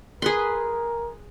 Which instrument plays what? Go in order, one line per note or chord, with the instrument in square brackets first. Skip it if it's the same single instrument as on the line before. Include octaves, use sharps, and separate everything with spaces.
[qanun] G#4 B4 C6 [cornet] A#4